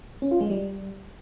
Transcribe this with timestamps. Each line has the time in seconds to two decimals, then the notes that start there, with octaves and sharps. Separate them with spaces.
0.22 C#4
0.31 F4
0.41 G#3
0.50 G3